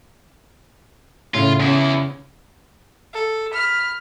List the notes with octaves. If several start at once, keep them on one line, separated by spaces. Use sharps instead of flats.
A2 C#3 F4
E2 C#3 E4
A4
B5 F6